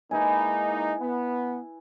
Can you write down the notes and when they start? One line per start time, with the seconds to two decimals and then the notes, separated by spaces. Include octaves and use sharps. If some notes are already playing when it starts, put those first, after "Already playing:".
0.11 G#3 A#3 D#4 E4 B4 G#5
1.00 B3